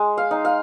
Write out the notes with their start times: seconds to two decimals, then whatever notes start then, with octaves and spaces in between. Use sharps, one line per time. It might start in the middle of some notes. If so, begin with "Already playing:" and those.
Already playing: G#3
0.18 F5
0.31 D#4
0.45 F5